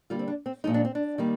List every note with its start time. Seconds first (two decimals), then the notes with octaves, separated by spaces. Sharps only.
0.10 D3 G3 A#3 F4
0.19 C4
0.28 D4
0.46 C4
0.64 A#2 F3 G#3 D#4
0.74 D4
0.85 C4
0.95 D4
1.18 D#3 G3 A#3